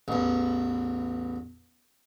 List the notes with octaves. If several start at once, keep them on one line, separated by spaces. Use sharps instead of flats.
A1 E2